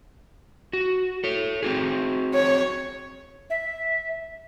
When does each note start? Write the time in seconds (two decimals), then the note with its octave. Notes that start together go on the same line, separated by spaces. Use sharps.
0.73 F#4
1.24 A4 C#5
1.63 C4 F#4 G#4
2.34 C#5
3.50 E5